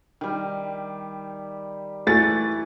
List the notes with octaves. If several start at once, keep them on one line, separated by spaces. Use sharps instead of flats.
D#3 G3
E3 A3 A6